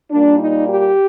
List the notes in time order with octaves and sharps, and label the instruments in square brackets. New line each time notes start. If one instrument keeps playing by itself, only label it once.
[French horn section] A#2 G3 A#3 D4
D#4
G4